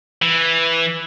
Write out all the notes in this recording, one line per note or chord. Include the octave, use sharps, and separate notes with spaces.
E3